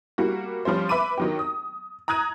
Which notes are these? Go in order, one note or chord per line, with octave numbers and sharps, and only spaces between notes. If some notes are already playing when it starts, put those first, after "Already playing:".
G3 A#3 F#4
F3 G3 C#4 C5
B4 E5 B5 D6 D#7
D#3 F#3 G4
D#6
A#5 D#6 F#6 G#6 D#7